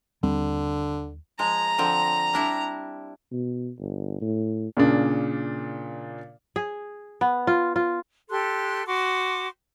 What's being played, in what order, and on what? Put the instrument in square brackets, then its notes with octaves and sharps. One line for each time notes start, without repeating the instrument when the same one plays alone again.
[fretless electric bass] D#2 G3 C4 [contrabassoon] D3
[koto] F3 G#3 [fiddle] A#5
[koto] D3 F3 C4
G3 D4 E4
[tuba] B2
G1
A2
[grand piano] A#2 C#3 D4
[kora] G#4
B3
F4
F4
[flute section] G4 A4 C6 F#6
F#4 C6 D6